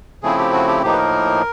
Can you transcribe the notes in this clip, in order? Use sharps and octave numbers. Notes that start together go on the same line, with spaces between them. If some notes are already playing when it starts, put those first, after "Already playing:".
C#3 F3 A3 C4 E4 G#4
G4
F#4
G4
A2 F3 A#3 D#4 G4
B4
A#4